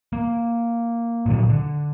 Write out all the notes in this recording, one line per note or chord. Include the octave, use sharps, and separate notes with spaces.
A#3
A#2 D3 F#3
D3